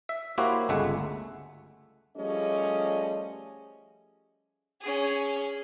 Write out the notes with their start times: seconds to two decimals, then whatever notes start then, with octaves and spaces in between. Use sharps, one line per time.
0.09 E5
0.38 A#3 E4 F#4 G4 C5 C#5
0.69 G1 C#2 G#3 A3 E5 F#5
2.17 F3 G3 A3 C#4 G#4 D#5
4.81 C#4 G#4